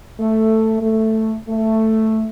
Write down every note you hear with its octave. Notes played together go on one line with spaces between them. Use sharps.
A3
A3
A3